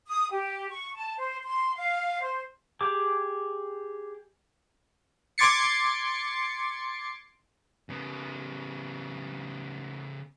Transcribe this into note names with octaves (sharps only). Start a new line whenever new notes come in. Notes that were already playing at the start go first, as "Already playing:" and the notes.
D#6
G4
C#6
A5
C5
C6
F5
C5
G4 G#4 D6
C6 D6 G#6 A6 C7 C#7
C#3 B3